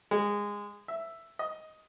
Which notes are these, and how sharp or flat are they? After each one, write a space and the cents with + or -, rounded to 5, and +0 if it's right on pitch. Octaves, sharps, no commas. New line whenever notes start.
G#3 -15
E5 +5
D#5 +10